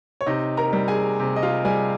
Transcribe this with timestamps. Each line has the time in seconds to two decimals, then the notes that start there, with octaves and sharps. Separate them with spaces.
0.21 C#5
0.26 C3 D#4 D#5
0.57 A#4 A#5
0.73 G3
0.88 G#4 G#5
1.20 C3
1.36 D#5
1.43 F4 F5
1.65 G3 G#4 G#5